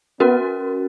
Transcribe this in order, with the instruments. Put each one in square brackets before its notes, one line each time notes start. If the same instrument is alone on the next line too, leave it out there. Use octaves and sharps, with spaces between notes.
[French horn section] B3 [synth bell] C#4 F#4 A#4